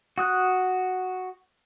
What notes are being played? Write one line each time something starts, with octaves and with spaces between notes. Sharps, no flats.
F#4 D#6 F#6